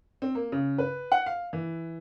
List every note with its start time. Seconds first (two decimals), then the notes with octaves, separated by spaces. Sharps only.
0.22 C4
0.35 A#3
0.52 C#3
0.78 B4
1.12 F#5
1.26 F5
1.53 E3